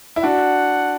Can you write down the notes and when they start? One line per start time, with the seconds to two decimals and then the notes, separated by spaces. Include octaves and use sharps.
0.16 E4
0.23 D4 F#4 F#5